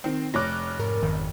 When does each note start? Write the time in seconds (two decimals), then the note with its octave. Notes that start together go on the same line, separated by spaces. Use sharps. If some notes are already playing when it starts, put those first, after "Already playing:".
0.04 D#3 C4
0.34 F1 C#5 D6 F6 F#6 A#6
0.79 G#2 A#4
1.02 G1 F2 D#3